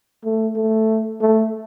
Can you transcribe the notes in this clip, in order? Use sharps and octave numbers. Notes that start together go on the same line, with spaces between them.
A3
A3
A3